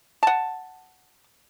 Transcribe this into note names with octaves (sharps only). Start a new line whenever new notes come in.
F#5 A5